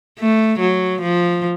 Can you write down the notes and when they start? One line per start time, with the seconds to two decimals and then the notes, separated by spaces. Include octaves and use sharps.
0.19 A3
0.59 F#3
1.02 F3